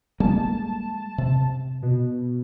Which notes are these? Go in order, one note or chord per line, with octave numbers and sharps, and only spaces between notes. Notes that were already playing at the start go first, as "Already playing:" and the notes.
G3 G#3 A#3 A5
C3
B2